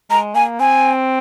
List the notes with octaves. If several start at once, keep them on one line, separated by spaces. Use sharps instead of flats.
G#3 A#5
A#3 G#5
C4 G#5